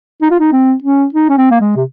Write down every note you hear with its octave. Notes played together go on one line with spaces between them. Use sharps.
D#4
F4
D#4
C4
C#4
D#4
C#4
C4
A#3
G#3
C3